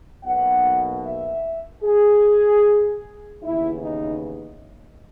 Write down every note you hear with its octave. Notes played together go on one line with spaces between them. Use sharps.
B1 B2 A#3 F#5
E5
G#4
D#2 C#3 E3 B3 E4
D#4